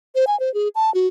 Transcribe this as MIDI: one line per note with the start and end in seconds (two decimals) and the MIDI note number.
0.15 0.25 72
0.27 0.38 80
0.40 0.52 72
0.54 0.68 68
0.75 0.93 81
0.94 1.07 66